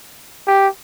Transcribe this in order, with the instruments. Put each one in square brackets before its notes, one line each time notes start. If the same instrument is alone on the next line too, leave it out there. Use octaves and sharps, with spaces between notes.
[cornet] G4